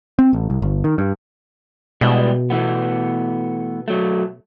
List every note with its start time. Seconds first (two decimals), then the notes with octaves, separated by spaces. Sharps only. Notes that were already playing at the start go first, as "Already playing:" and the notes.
0.19 C4
0.33 A1
0.50 C2
0.62 G1
0.84 D#3
0.98 G2
2.01 B2 G3 G#3 E4
2.50 E3 A3 B3
3.88 F#3 A3